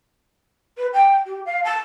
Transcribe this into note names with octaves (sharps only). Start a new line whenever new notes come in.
B4
G5
G4
F5
A5